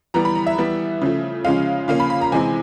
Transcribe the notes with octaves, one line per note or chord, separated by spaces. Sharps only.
E3 G3 B3 A#5
B5
A#5
E5
E3 G3 B3
C#3 F3 A3
C#3 F3 G#3 C#4 F5
C#3 F3 A#3 C#4 F5
B5
B5
A#5
C3 E3 G#3 C4 G#5